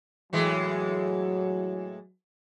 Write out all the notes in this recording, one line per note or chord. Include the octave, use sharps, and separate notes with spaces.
A2 E3 F#3 G#3